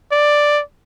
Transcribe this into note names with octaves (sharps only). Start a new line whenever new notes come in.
D5